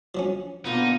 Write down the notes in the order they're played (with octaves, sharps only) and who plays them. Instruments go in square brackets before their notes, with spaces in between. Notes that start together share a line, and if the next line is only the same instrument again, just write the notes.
[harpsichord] F3 F#3 C#4
[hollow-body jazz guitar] B2 F4 [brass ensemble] D3 A#3 B3 [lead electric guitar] D#4